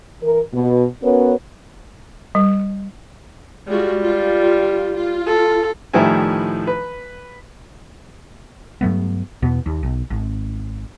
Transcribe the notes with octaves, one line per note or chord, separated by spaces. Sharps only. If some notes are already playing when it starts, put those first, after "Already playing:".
E3 A#4
B2
B3 C#4 F#4 A#4 B4 C#5
G3
G3 G#3 F4 F#4
F4
F4
A4
A2 D#3 F3 G3 E4 G#5
B4
G2 F#3 A3 B3
E2 B2 B3
D#2
B1
G#1